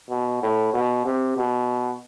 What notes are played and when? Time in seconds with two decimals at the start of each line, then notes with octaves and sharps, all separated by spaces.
0.10 B2
0.43 A2
0.74 B2
1.05 C3
1.37 B2